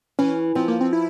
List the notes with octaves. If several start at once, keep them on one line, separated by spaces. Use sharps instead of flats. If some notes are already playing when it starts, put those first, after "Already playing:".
E3 C#4
F3 C4
A#3
C4
E4